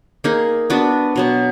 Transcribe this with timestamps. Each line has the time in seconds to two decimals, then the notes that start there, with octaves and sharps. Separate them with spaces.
0.24 A#3 D#4 G#4
0.70 B3 D4 F#4 B4
1.16 B2 F#3 B3